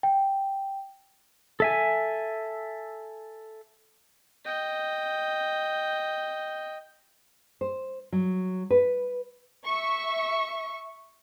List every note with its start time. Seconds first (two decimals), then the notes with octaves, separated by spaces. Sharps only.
0.03 G5
1.60 A4 E5 G#5
4.45 D#5 G5
7.61 C5
8.13 F#3
8.71 B4
9.65 E5 C#6